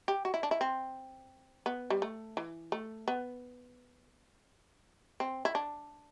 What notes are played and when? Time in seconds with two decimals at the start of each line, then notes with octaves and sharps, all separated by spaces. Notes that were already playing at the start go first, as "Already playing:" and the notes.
0.08 G4
0.25 F#4
0.34 E4
0.43 D4
0.51 E4
0.61 C4
1.66 B3
1.90 G3
2.02 A3
2.37 E3
2.72 A3
3.08 B3
5.20 C4
5.45 E4
5.55 D4